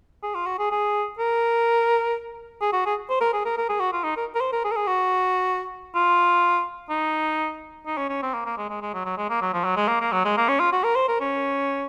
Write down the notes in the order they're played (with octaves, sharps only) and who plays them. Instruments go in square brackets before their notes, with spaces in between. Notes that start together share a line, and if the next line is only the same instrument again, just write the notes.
[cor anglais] G#4
F4
F#4
G#4
G#4
A#4
G#4
F#4
G#4
C5
A#4
G#4
A#4
A#4
G#4
F#4
F4
D#4
A#4
A#4
C5
A#4
G#4
A#4
G#4
F#4
F4
D#4
D#4
C#4
C#4
C4
A#3
A#3
G#3
G#3
G#3
F#3
F#3
G#3
A#3
F#3
F3
F#3
G#3
A#3
A#3
F#3
G#3
A#3
C#4
F4
F#4
A#4
C5
A#4
C#4